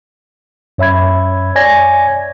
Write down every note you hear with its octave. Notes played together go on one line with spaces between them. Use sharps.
F#2 C#5 E5 B5 G#6
C#5 D5 G#5 G#6 A#6